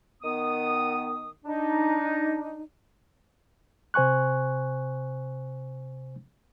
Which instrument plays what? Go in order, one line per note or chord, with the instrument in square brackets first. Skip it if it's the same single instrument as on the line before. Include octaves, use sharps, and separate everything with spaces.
[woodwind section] D#3 B3 D#6
D4 D#4
[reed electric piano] C3 C5 G#5 C#6 F#6